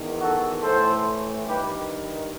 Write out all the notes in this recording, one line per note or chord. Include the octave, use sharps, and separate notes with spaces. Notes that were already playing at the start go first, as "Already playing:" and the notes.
Already playing: E2 D#3
F#4 A4
A2 E3 A4 C5
G2 D#3 G4 B4